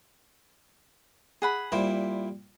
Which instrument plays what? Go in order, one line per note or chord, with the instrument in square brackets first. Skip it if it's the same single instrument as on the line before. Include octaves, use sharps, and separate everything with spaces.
[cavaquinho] G#4 F#5 B5
[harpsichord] A#2 G3 [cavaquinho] E4 C5